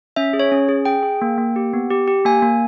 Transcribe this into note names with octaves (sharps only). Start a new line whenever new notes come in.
C#4 E5
G#4
C#5
C#4
G#4
G#4 G5
G#4
A#3
A#3
G4
B3
G4
G4
A#3 G#5
A#3